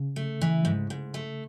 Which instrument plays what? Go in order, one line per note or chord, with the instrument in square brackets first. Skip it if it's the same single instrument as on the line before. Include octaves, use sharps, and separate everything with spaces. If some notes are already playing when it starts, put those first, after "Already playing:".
Already playing: [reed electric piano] C#3
[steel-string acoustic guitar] A3
E3
G#2
G#2
A3